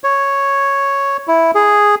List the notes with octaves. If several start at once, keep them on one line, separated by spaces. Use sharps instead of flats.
C#5
E4
G#4